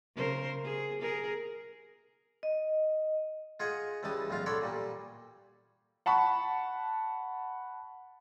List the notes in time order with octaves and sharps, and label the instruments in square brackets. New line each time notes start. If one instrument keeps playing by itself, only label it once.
[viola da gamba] C#3 A#4 C5
G#4
G#4 A#4
[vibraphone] D#5
[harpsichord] F4 G#4 D#5 F#5 G#5
C#2 E3 G3 A5 D#6
B1 E2 F4 F5
F#4 A4 C#5 D5 B5 C6
A#2 G3
[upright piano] F#5 A5 B5 C#6